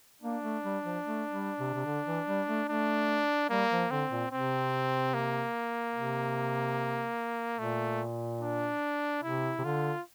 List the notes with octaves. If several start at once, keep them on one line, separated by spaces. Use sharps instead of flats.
A#3 D4
A3
G3
F3
A3
G3
C3
C3
D3
E3
G3
A3
A3 D4
G3 A#3
F3
D3 C4
A#2
C3 C4
A#3
C3
A#2 A3
D4
C3 E4
C3
D3 F4